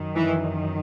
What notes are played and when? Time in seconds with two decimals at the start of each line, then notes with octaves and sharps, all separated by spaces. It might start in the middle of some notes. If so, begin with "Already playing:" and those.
Already playing: F#2 D#3
0.15 E3